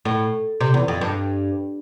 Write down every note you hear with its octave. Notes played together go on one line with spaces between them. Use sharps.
A2
C3
E2
F2
G2